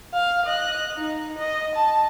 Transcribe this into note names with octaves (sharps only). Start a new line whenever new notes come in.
F5
D#5 F#6
D#4
D#5
A5